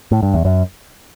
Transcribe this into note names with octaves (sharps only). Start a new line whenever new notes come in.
A2
G2
E2
F#2